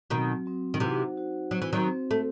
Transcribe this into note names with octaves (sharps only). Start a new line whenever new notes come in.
B2 D#3 F#3 C4 F#4
F#3 C4 F#4
D#3
C3 E3 D#4 F#4 C5 F#5
D#4 F#4 C5 F#5
F#3 C4 F#4 C5
E3
D#3 F#3
C4 F#4 C5
A3